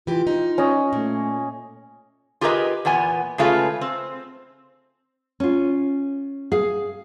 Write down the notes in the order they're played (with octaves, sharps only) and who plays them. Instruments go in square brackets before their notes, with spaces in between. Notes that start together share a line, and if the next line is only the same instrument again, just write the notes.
[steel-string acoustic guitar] E3 G4 [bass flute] F4
[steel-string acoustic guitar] D#4
[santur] C#4 D#5
[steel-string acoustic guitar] A#2 [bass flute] A3
[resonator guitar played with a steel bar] F4 G4 G#4 A#4 B4 D#5
E2 A#2 B3 G#5
C#3 G#3 A3 F4 G#4 B4
C4
[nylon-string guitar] C#4 F4
G#4 F5